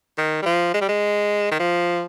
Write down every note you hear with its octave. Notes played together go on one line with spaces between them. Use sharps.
D#3
G3
F3
G#3
G3
G#3
D#3
F3